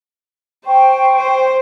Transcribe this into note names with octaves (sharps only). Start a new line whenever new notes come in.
C5 G5 C#6
C5